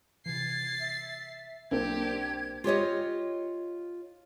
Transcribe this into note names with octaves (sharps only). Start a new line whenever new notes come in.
C3 E3 G#6 A6 C7
E5
B1 A#3 C4 D4 G4 G#6
F4 G4 C#5 D#5